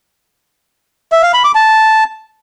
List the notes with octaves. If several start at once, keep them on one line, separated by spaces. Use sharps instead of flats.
E5
F5
B5
D6
A5